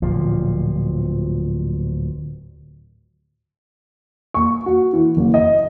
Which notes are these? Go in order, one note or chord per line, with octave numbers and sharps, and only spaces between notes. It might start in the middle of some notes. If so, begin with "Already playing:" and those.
D1 A#2 F3
C#6
F#4
E3
F#1
D#5